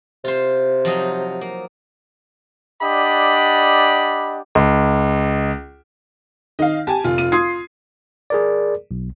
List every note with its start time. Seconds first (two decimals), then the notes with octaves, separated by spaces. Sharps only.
0.25 C3 F4 C5
0.85 F3 F#3 D#4
1.41 A#3
2.81 D4 G4 D5 D#5 F#5 B5
4.55 C#2
6.59 D#3 D#5 F5
6.87 G4 G#5 A5
7.04 F1 F4
7.18 F4 D#7
7.32 F4 C6 D#6 G#6 C7
8.30 G#4 A#4 D5
8.91 B1